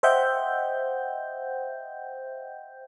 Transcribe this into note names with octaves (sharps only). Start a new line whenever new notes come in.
C5 D#5 E5 F#5 G5 G6